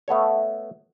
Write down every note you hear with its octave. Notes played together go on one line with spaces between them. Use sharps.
A3 B3 A4 C#5